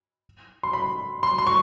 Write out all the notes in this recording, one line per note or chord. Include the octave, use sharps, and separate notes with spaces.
C6
B5
C6
C6
C#6